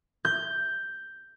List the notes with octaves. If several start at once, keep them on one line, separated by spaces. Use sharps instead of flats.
G6